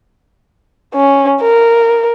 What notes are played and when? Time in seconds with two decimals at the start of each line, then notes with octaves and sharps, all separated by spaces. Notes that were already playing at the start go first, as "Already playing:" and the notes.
0.94 C#4
1.41 A#4